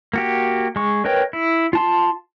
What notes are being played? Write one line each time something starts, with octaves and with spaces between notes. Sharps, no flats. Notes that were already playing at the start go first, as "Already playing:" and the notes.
A#3 F#4 G4
G#3 C#6
A#4 B4 C#5 D#5 G5
E4
F4 A5 C6